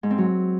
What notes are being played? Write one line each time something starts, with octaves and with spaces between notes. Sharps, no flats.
G#2
C4
F#3